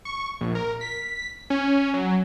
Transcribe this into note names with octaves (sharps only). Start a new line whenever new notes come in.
C#6
A#1
A#4
B6
C#4
F#3